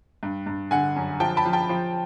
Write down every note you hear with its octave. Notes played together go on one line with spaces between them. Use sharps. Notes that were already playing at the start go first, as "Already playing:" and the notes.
G2
G2
D3 F#5 G#5
F#2
F3 G5 A5
A5 B5
F3
G5 A5
F3